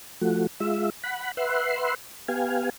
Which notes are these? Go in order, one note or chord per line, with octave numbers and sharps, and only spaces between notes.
F3 A3 F#4
G#3 F4 E5
F#5 B5
B4 E5 F#5 C6
B3 G4 F5 G#5